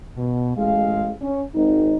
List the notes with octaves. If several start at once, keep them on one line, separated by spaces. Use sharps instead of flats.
B2
A1 G#3 F5
C#4
G#1 D#4